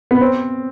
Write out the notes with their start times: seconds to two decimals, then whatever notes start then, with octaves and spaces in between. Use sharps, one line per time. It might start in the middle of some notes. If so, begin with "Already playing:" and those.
0.11 B3
0.21 C4